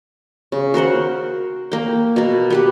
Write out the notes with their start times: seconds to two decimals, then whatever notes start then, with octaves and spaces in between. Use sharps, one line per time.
0.52 C#3
0.74 F#4 A#4 C5 F#5
1.72 A#3 G5
2.16 B2 A#3
2.50 B3 G4 B4